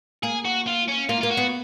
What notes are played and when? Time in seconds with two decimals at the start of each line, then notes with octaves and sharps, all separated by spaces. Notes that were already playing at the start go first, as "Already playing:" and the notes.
0.23 A#3 G#4
0.45 F#4
0.67 F4
0.88 C#4
1.09 A#3 F4
1.21 A#3 F4
1.31 F#4
1.37 B3